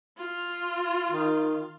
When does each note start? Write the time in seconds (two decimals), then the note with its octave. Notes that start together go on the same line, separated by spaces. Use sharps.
0.17 F4
1.11 D#3